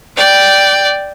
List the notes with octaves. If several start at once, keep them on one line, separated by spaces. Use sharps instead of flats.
D5 G5